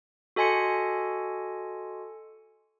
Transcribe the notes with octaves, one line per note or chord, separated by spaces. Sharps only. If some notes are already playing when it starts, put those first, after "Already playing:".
F#4 A4 D#5 G#5 C6 C#7